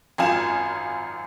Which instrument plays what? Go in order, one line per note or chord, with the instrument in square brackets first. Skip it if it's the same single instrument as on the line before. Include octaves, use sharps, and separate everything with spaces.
[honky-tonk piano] G#1 F#2 F4 G#5 E7